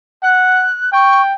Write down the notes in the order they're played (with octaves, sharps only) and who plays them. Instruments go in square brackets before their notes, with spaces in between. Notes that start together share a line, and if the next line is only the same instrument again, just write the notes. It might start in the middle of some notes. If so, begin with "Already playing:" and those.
[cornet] F#5 [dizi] F#6
[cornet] G5 [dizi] C#6